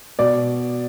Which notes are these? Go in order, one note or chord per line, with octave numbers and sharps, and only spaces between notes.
B2 D5